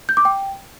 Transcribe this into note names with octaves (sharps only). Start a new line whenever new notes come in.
G6
D6
G5